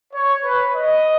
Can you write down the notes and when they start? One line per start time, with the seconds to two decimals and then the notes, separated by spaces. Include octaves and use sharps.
0.13 C#5
0.44 B4
0.75 D#5